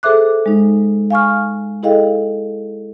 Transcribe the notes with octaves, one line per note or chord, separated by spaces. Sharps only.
G#4 A4 C5 E5 D6 F#6
G#3 D#4
F5 G#5 C#6 F6
E4 G#4 A4 D#5 F5 G5